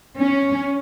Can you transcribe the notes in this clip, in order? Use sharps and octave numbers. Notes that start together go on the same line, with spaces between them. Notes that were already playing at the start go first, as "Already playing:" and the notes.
C#4